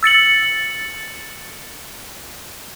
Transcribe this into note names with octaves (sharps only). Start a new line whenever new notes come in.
E6 A6 C#7 F#7